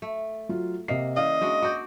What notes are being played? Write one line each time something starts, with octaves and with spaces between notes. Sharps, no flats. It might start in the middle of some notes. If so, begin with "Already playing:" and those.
A3
F#3 F4
C3 A#3 D#5 C7
C#3 E3 D5 D#5 F5
G#3 D4 F#4
F#4 D5 D6 G6